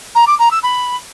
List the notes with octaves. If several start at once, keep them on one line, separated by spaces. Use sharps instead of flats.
A#5
D6
A#5
E6
B5